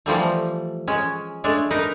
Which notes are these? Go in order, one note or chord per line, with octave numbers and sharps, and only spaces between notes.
E3 F3 G3 A3
G#3 C#4
G#3 A3 D4
D#4 A#4 B4